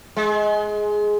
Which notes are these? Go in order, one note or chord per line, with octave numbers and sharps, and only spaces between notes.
G#3